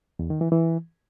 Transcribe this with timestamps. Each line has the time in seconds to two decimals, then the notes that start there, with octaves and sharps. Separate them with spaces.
0.19 E2
0.30 D#3
0.41 E3
0.52 E3